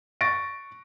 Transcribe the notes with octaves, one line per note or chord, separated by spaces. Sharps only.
C#6 A6 A#6 D7